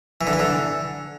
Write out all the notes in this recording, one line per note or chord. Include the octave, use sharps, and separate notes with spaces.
E3
D3
E3
D3